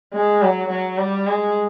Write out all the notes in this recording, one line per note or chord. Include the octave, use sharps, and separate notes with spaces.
G#3
F#3
F#3
G3
G#3